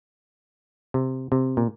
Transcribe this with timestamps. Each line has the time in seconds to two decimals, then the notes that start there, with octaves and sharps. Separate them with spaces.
0.94 C3
1.32 C3
1.57 A#2